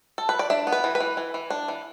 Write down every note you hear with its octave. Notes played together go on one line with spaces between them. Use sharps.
A4
B4
D5
D4 E5
B3
B4
E3
B4
E3
E3
E3
D4
E3